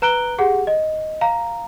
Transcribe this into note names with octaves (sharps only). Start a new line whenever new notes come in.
B4 A#5 F#6 D7 G7
G4 G#4 F#5
D#5
F5 A#5